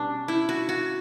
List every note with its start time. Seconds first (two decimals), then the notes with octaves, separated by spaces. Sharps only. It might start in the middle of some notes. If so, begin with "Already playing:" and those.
Already playing: B2 G3 C#4 D4
0.28 E4
0.49 F#4
0.69 F#4